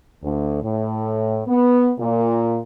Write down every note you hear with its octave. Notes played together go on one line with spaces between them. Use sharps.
D2
A2
B3
A#2